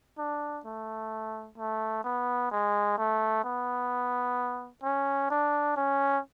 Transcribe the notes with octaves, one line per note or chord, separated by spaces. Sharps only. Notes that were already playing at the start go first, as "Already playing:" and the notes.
D4
A3
A3
B3
G#3
A3
B3
C#4
D4
C#4